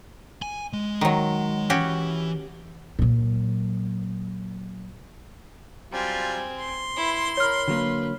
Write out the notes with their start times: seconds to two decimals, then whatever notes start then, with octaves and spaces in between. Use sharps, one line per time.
0.42 G#5
0.73 G#3
1.01 D#3 F#3
1.70 E3 C#4 F#4 G4
2.99 A#2 F#3
5.92 F#3 G3 C4 F4 G#5
6.57 C6
6.96 E4 B4
7.37 A#4 C#5 B5 F6
7.68 D3 F#3 A#3 B4